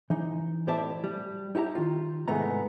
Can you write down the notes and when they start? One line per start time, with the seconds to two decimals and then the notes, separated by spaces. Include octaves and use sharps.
0.10 E3 D#4
0.67 A2 G4 C5 D5 E5 A5
1.04 G3
1.55 D#4 E4 G4 A5 A#5
1.75 D#3 F4
2.28 C2 G#2 G#3 A3 B3 A#5